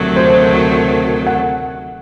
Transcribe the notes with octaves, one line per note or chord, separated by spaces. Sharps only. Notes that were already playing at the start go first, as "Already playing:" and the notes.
Already playing: D2 C3 D#3 F#3 A3
C5
F#5